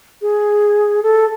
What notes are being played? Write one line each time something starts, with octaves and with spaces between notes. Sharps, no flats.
G#4
A4